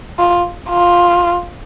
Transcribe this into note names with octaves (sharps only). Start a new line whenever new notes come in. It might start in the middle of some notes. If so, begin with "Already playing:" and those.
F4
F4